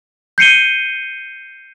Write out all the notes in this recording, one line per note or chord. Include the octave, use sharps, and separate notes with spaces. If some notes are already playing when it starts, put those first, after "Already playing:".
G6 C7 C#7 D#7 G7